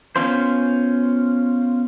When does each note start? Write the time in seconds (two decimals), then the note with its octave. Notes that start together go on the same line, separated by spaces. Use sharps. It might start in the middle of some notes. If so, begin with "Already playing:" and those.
0.16 B3 C#4 F4 C5